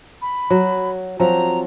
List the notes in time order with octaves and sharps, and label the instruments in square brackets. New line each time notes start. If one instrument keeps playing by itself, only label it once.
[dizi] B5
[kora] F#3
[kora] F3 F#3 C4 [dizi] A#5